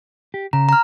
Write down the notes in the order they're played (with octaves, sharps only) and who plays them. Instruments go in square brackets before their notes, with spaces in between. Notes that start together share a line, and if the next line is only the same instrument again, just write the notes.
[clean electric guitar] G4
[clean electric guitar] C#3 [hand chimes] A#5
[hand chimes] A#5 F6